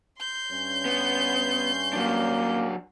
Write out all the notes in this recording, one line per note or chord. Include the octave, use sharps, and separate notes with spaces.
C6 G6
G2 C#4
B3
F#3 A#3 D4